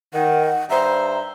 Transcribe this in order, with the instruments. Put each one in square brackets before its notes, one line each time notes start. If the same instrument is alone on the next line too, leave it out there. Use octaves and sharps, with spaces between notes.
[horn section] D#3 [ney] F#5
[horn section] G2 C5 E5 [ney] A#5